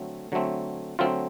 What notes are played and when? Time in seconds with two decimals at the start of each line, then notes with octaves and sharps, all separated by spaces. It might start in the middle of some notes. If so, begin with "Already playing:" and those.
Already playing: D3 F#3 A3 C4
0.32 D3 F#3 A3 C4
0.99 D3 F#3 A3 C4 F4